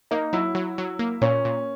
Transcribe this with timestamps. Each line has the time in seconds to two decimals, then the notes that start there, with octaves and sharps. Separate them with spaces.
0.11 A#3 D#4
0.33 F#3 E4
0.55 F#3
0.78 F#3
0.99 A#3
1.22 A#2 C#4
1.45 A#2